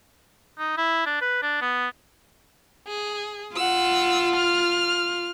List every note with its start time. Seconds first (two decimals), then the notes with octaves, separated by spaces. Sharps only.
0.59 D#4
0.78 E4
1.06 D4
1.21 B4
1.43 D4
1.62 B3
2.87 G#4
3.56 F4 F#5 E6
4.35 F6